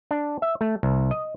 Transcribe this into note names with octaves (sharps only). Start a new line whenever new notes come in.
D4
E5
A3
C2
D#5